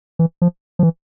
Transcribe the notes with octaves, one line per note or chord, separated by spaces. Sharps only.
E3
F3
F3
E3